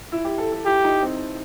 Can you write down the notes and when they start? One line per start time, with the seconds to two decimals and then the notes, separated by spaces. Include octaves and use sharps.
0.12 E4
0.25 G4
0.38 A4
0.52 A4
0.65 E4 G4
0.84 D#4
1.02 C4